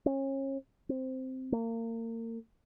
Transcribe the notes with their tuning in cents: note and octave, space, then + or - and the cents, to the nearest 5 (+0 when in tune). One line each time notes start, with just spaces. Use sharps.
C#4 -35
C4 -5
A#3 -35